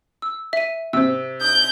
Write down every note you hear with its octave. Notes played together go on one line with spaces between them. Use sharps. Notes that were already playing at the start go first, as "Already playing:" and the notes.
E6
E5 D#7
C3 C5 E6
D#6 G6